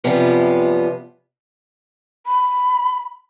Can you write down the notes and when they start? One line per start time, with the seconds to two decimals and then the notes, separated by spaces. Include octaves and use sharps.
0.04 F#2 C3 F3 G3 B3 F4
2.26 B5